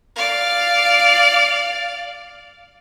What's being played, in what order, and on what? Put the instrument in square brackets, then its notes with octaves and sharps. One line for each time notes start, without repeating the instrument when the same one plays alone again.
[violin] D5 F5